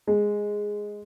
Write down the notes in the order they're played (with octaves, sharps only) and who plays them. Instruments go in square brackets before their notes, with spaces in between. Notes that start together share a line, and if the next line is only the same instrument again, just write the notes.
[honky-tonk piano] G#3